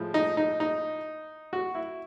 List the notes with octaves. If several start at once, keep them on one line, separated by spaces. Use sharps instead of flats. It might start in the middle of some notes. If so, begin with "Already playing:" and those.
Already playing: A2 F3 G#3
D#4
D#4
D#4
F#4
E4